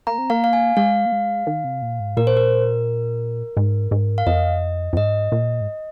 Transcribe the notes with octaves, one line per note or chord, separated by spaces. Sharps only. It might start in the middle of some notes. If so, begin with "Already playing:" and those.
A#3 A#5
C4
A#3 F5
F5
G#5
G#3 F5
A#3
G#3
D#3
C3
A#2
G#2
A#2 A#4
C5
A#4
G#2
G#2
F5
F2 D#5
F2
G#2 D#5
A#2
G#2